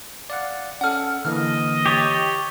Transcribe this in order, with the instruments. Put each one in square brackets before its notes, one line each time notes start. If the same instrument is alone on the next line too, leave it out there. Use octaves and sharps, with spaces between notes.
[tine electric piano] D5 F5 F#5
[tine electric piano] C#4 A4 [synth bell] F#5 F6
[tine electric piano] D3 E3 A#3 [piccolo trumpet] D#5 [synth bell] F6
[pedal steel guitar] G4 C#5 [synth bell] A6